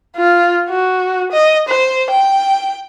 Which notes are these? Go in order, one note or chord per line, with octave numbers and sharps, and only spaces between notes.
F4
F#4
D#5
C5
G5